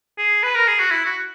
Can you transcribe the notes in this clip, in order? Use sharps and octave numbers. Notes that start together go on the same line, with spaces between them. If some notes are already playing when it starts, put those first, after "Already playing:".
G#4
B4
A#4
G#4
F#4
E4
F#4